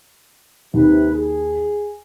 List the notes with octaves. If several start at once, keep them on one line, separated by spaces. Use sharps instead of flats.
D#2 C3 B4
G#4